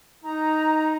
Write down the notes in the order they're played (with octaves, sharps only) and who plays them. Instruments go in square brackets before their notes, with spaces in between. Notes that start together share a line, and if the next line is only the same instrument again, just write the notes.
[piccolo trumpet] D#4 [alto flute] A#5